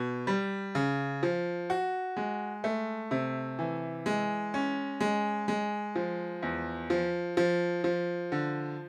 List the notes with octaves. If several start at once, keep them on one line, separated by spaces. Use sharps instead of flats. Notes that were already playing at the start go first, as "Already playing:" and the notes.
Already playing: B2
G3
C#3
F3
F#4
G#3
A3
C3
E3
G#3
C#4
G#3
G#3
F3
E2
F3
F3
F3
D3